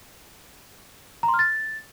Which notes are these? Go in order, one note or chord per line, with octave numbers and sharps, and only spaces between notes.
A#5
C6
F6
A6